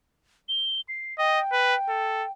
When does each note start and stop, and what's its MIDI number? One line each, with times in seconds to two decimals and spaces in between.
0.49 0.81 103
0.89 1.17 96
1.19 1.40 75
1.19 2.32 79
1.52 1.75 71
1.89 2.25 69